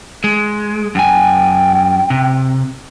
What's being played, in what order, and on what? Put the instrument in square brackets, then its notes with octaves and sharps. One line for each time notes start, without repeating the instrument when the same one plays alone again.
[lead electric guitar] G#3
[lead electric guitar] F#2 G#5 [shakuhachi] G5
[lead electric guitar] C3